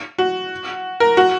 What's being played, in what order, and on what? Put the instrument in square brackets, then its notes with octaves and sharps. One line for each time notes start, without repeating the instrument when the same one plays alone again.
[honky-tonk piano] F#4
A#4
F#4